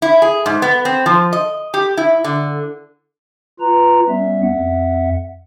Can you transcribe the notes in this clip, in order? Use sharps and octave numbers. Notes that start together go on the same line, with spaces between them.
E4
G#4
G#2
B3
C4
F3
D#5
G4
E4
D3
F4 B4 A#5
G3 B3 C#4 E5
F2 E5 F#5